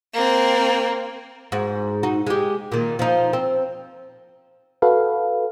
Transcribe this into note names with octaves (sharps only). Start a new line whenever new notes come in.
A#3 C4
G#2 F#4
D#4 F#4
G#3 G4
A#2 D#3
F3 D#4
C4
F#4 A4 B4 F5